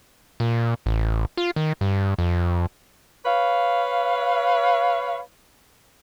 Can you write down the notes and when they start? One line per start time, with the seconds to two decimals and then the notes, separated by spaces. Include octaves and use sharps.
0.40 A#2
0.86 A1
1.37 F4
1.56 D#3
1.81 G2
2.18 F2
3.25 B4 C#5 F5